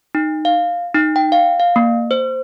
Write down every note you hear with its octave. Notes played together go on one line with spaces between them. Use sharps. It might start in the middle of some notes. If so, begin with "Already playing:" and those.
D#4
F5
D#4
G5
F5
F5
A#3
C5